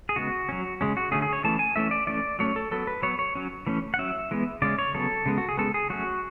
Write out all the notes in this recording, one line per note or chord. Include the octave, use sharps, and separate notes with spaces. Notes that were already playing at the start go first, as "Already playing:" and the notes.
G#4
C#3 G#3 B3 F#4
F#3 C#4
C#3 G#3 C#4
F#4
D3 A3 C#4 G#4
G#4
C#5
E3 A3 C#4 A5
G#5
E3 A3 C#4 E5
D5
E3 A3 C#4 D5
F#3 A3 C#4 C#5
A4
F#3 B3 A4
B4
F#3 B3 C#5
C#5
F#3 C#4
E3 A3 C#4
F#5
F#3 C#4 E5
E3 G#3 B3
C#3 G#3 C#4 D5
C#5
C#3 F#3 B3 A4
C#3 G#3 B3
F#4
G#4
C#3 G#3 B3 A4
G#4
F#3 A3 C#4 F#4